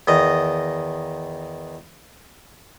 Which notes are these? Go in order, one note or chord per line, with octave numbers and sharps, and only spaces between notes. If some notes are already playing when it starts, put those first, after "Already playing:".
E2 D#3 D#5 A#5